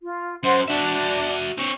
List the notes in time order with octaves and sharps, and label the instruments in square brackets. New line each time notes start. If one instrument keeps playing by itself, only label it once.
[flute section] F4
[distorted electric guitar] F#2 [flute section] C5 F#5 C6
[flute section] D4 [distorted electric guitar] F#4 E5
[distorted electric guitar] C4 C#5